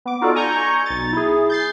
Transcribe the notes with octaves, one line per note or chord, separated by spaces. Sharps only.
B3 D6
D#4 F4 F#4 A4 D5
G#5 A#5 C#6 G6
B1 A6
E4 G#4
G6 A6 C7